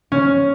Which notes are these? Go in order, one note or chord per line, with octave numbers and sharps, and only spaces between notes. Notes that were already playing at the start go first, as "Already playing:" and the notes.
C#4